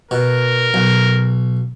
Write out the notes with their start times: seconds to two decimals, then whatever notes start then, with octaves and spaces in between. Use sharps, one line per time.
0.11 B2 A#4
0.74 B1